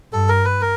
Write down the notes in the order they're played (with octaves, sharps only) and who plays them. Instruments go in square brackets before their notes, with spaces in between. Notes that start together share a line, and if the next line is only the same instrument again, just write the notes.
[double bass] G2 [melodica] A4
[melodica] A#4
B4
A#4